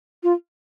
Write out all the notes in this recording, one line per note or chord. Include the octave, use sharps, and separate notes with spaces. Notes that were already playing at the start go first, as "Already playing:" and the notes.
F4